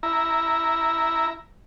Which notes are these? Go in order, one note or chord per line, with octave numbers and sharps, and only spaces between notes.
E4 A#5